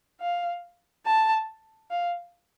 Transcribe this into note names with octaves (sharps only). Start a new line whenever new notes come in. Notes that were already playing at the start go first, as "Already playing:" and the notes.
F5
A5
F5